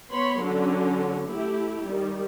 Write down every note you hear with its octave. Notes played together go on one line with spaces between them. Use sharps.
B3 C#5 B5 C6
D3 F#3 C#4
A3 E4 G4
D#3 G3